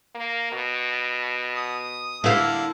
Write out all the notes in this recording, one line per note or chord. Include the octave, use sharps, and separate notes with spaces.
A#3
B2
D#6
D3 A#3 E4 A4 F5